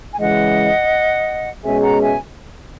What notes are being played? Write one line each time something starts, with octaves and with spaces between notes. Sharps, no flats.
G#5
C#3 E3 G#3 D#5 F#5
B2 G#3 C#4 G#4 E5 G#5
F#5 A#5
E5 G#5